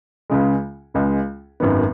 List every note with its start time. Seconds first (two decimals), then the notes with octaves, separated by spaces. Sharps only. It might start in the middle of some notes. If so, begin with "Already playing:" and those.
0.30 C#2 C#3 G#3
0.94 C#2 C#3 G#3
1.60 G#1 F#2 D#3 B3